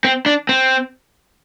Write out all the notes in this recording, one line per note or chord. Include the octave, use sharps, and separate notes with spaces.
C4
D4
C4